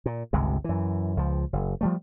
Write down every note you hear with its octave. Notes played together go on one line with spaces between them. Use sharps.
A#2
G1 C#2 C3 G#3
F#2 E3
C#2 F3
F#1
F3 G3 A3